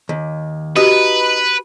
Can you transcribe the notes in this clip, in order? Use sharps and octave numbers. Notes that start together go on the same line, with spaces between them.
D#2
D#4 F#4 G4 B4